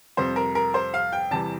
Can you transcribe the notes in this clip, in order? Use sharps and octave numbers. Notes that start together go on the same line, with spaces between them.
F2 C3 G3 C4 C5
A#4
A#4
C5
F5
G5
E2 C3 E3 G3 C4 A5